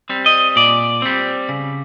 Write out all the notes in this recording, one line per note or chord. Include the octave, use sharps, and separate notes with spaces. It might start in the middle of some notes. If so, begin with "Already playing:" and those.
G3 C4
D#5
A#2 D5
G3 C4
C#3